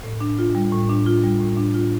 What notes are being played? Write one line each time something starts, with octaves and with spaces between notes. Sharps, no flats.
A2
D4
F4
G3
A2
D4
F4
G3
A2
D4
F4